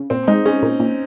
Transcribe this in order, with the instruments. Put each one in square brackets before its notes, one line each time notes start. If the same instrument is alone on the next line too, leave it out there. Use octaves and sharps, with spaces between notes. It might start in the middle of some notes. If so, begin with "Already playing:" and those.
Already playing: [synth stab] C#3
[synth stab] A#2 [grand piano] C4
[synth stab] G#3 [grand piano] D#4
[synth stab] G#3 [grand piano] C#4
[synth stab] A#2
A#2